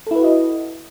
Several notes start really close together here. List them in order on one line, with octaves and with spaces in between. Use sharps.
A4 E4 B4 F#4 D#5